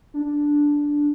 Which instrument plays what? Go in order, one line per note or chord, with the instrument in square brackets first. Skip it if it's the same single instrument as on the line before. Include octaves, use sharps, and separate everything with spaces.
[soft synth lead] D4